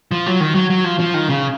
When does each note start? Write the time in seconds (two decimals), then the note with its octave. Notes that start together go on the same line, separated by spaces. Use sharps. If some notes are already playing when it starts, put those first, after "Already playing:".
0.12 F3
0.26 F#3
0.40 D#3
0.55 F#3
0.70 F#3
0.84 F3
0.99 F3
1.14 D#3
1.29 C#3